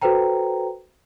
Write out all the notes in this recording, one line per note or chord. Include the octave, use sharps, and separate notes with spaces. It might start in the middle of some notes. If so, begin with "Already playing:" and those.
F#4 A4 B4 C5 G5 A#5